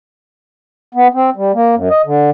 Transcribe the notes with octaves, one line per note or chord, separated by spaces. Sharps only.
B3
C4
G3
A#3
F#2
D#5
D3